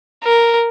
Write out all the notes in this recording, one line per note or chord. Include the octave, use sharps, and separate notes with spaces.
A#4